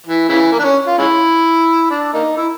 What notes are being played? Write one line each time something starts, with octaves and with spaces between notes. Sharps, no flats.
E3
C#3 E3
A#3
D4
C#4
F4
G#3 C#4 E4
D4
A#3 D#4
E4